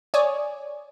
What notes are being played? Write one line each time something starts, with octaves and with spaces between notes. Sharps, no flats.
C#5 D5 G#5 D#6